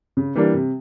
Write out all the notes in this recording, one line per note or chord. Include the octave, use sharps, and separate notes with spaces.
C#3
E3 G3 A#3 D4
C3